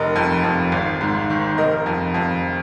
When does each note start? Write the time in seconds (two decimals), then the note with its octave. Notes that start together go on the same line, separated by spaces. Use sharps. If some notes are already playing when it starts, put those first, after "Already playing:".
Already playing: F1 A#4 D#5
0.16 F2
0.44 F2
0.72 G#1
1.01 G#2
1.30 D#3
1.57 F1 A#4 D#5
1.86 F2
2.14 F2